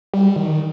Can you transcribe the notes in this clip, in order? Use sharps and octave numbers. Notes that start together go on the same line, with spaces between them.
G3
D#3